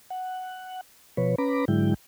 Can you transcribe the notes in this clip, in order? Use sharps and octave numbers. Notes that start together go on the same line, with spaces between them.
F#5
B2 F3 B4 C#5
C#4 B4 A#5 B5 D6
G#2 D3 F#3 G#3 E4 G5